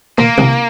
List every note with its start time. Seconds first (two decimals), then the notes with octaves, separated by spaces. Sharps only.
0.18 A#2 A#3
0.38 C2